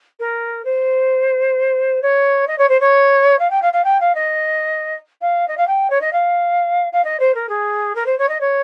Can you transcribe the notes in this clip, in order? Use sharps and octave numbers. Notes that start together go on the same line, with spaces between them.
A#4
C5
C#5
D#5
C#5
C5
C#5
F5
G5
F5
F5
G5
F5
D#5
F5
D#5
F5
G5
C#5
D#5
F5
F5
D#5
C5
A#4
G#4
A#4
C5
C#5
D#5
C#5